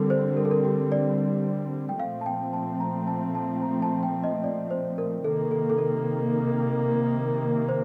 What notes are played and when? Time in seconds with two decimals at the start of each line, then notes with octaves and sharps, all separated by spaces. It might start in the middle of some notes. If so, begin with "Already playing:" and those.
Already playing: D3 G3 C4 A4 A#4
0.10 C5
0.37 A#4
0.45 A4
0.51 A#4
0.65 G4
0.92 D5
1.89 G5
1.99 A#2 F3 A3 C4 F5
2.21 A5
2.26 G5
2.53 A5
2.80 A#5
3.07 A5
3.35 A5
3.62 A#5
3.82 A5
4.03 G5
4.24 D#5
4.44 D5
4.71 C5
4.98 A#4
5.24 C3 D#3 A#3 A4
5.51 A4
5.70 A4
5.78 A#4
7.69 C5